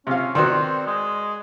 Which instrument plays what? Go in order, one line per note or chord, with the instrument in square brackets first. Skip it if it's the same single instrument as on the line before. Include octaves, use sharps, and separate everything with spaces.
[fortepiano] C3 F5 [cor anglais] C#4
[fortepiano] D#3 B3 F#4 [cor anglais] C4 [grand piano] D5 C6
[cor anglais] G#3